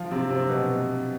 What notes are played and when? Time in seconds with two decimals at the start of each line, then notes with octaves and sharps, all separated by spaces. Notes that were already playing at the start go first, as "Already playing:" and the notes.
Already playing: F3 F4
0.11 C3 C4
0.30 C3 C4
0.49 B2 B3